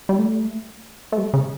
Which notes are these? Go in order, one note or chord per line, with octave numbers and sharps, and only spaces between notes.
G3
A3
A3
G3
C#3